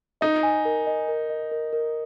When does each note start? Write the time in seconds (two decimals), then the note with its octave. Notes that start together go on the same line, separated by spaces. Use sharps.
0.21 D#4 D#5
0.43 G#5
0.65 A#4
0.87 D#5
1.08 A#4
1.30 D#5
1.51 A#4
1.73 A#4